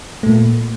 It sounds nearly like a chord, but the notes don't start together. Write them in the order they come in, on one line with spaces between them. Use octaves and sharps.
A3 A#2 A#3